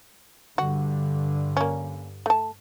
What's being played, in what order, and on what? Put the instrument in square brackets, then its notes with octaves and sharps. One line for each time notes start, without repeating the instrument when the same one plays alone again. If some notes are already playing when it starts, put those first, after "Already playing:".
[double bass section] G2 D3 [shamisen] F#4
[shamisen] A#3 C#4
A3 A5